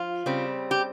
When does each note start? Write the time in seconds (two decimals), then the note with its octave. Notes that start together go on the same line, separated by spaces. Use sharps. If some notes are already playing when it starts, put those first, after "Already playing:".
Already playing: F3 F4
0.26 C#3 G3 C4
0.71 G4